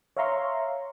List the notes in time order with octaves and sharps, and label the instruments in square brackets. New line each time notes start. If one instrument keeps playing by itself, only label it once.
[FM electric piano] C#5 E5 F5 A#5 C6 C#6